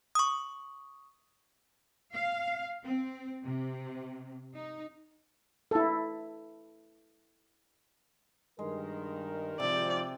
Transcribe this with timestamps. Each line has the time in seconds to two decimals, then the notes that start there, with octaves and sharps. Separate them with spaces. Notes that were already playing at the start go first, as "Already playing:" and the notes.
0.15 C#6 D#6
2.13 F5
2.85 C4
3.44 C3
4.55 D#4
5.71 E4 A4
8.59 G2 D#3 G#3 A#4
9.60 G#1 C3 F3 D5 G5